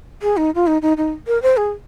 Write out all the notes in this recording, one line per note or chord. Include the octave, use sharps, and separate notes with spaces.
G#4
D#4
F4
D#4
D#4
D#4
A#4
C5
G#4